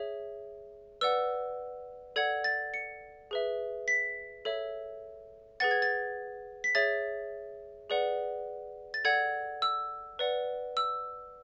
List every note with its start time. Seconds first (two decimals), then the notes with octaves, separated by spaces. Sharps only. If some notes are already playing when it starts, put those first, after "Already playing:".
Already playing: G#4 C#5 E5
1.01 B4 D5 F#5 E6
2.16 A4 D5 F#5 G#6
2.44 A6
2.74 C#7
3.31 G#4 B4 E5
3.88 B6
4.45 A4 C#5 E5
5.60 G#4 B4 F#5 A6
5.71 G#6
5.82 A6
6.64 B6
6.75 G#4 C#5 E5 A6
7.90 G#4 B4 D5 F#5
8.94 A6
9.05 A4 D5 F#5 G#6
9.62 E6
10.19 B4 D5 F#5
10.77 E6